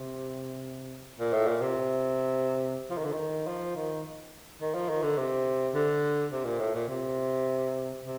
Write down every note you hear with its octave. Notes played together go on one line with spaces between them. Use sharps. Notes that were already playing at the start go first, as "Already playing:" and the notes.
Already playing: C3
A#2
A2
A#2
C3
F3
D#3
D3
D#3
F3
D#3
D#3
F3
D#3
D3
C3
D3
C3
A#2
A2
A#2
C3
C3